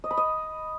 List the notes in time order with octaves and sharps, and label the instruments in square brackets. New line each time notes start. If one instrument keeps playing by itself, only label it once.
[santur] D#5
B5
D#5